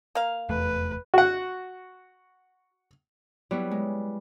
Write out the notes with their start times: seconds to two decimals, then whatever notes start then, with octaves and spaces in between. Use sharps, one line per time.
0.15 A#3 F5
0.49 F1 E2 A3 B4
1.14 F#4 F#5
3.51 F#3 G3 B3 E4
3.71 G#3